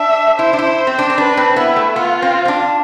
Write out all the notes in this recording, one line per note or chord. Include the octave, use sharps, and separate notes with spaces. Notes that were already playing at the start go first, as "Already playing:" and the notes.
Already playing: D4 E5
E4 C5
D4
E4
C4
D4
C4
D4 B4
C4
B3 E4
A3
B3 F4
C4
C4
D4